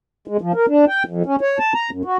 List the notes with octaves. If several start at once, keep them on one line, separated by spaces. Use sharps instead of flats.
G#3
F3
A#4
D4
G5
F2
C#4
C#5
A5
A#5
F#2
F#4